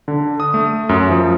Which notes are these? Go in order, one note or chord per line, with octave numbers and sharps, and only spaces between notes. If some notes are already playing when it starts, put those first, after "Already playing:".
D3
D#6
A3
F#2
F3